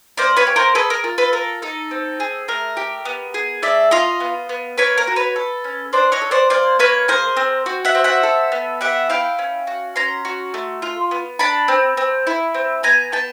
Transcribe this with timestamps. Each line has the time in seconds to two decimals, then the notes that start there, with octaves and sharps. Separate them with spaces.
0.17 A#3 C5 D5
0.37 B4 C#5
0.47 G4
0.56 A#4 C5
0.75 G#4 A4 B4
0.90 A#4
1.04 F4
1.18 A4 B4
1.33 A4 A#4
1.62 D#4 A4
1.91 C4
2.20 G#4
2.48 A3 A#4
2.77 G4
3.05 B3
3.34 G#4
3.62 A3 D5 E5
3.91 F4 D#5 F5
4.20 B3
4.49 B3
4.78 A#3 B4 C#5
4.98 A#4
5.07 F#4
5.16 B4 C#5
5.36 A4
5.64 C#4
5.93 D4 C5 D5
6.12 C#5 D#5
6.21 A4
6.31 C5 D5
6.50 A#3 C5 D5
6.79 A#3 B4 C#5
7.08 G#4 A#4 C5
7.37 C4
7.66 F#4
7.85 E5 F#5
7.95 C4
8.04 E5 F#5
8.23 A4
8.52 B3
8.81 G4 E5 F#5
9.09 E4 F5 G5
9.39 C#4
9.67 F#4
9.96 C#4 A#5 C6
10.25 F#4
10.54 A3
10.82 F4
11.11 B3
11.39 D4 A5 B5
11.68 C4
11.97 C4
12.27 E4
12.54 C4
12.83 B3 G#5 A#5
13.12 B3 G5 A5